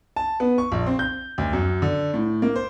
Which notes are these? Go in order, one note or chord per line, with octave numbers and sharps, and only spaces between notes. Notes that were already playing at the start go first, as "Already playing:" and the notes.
A5
B3
C#6
A#1
C4
G6
D2
F#2
D3
A2
A#3
C5